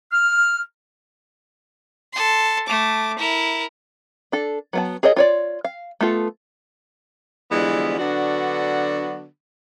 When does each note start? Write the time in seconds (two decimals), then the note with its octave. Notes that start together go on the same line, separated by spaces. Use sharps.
0.11 F6
2.13 A4 C6
2.67 A3 D6
3.19 E4 A#4
4.32 D4 A4
4.73 F#3 B3 A5
5.03 G#4 A#4 C#5 D#5
5.16 F4 C#5 D5
5.64 F5
6.01 A3 B3 F4 A4
7.52 D3 E3 F3 G3 G#3 B3
7.99 D3 F#3 B3 D4 F#4